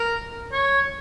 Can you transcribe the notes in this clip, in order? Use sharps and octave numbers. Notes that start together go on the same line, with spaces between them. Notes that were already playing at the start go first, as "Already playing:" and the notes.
Already playing: A#4
C#5